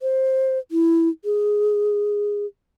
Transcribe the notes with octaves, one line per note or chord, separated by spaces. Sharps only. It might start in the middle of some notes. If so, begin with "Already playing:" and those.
C5
E4
G#4